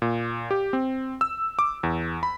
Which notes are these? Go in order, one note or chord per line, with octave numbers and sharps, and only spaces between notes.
A#2
G4
C4
E6
D6
E2
B5